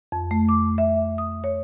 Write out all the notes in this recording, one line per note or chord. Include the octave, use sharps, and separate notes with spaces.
F2
A3
D6
E5
D#6
C#5